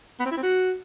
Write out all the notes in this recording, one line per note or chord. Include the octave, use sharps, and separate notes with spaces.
B3
C4
E4
C4
F#4